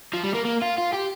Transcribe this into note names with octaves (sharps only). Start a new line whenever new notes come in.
F3
G3
A#3
A#3
F4
F4
G4